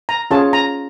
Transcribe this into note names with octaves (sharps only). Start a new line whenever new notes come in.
A#5
C#4 F4 G#4 C#5 A5
A#5